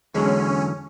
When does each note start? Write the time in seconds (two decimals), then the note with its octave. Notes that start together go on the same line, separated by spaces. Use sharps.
0.15 E2 D3 F#3 G#3 C#4